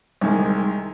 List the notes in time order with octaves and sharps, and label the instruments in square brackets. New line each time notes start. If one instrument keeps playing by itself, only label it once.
[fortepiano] C2 D#3 G#3